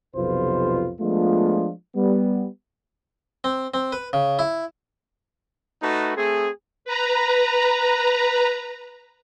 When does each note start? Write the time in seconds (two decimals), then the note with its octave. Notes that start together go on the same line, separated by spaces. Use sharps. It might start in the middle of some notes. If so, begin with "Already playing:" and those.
0.15 B1 F2 C3 F4 B4 C5
1.01 F3 G#3 A3 B3 D4 F4
1.96 G3 B3
3.44 C4
3.74 C4
3.92 B4
4.13 C#3
4.39 E4
5.82 A3 D#4 F#4 B4 A5
6.16 A3 C4 G#4
6.85 B4 A#5